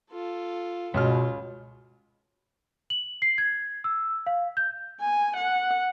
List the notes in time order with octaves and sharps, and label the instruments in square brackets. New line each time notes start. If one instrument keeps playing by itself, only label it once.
[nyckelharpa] F4 A4
[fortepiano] C#2 F6 [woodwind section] B2 [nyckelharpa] F4
[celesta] F#7
C7
G#6
E6
F5
G6
[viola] G#5
F#5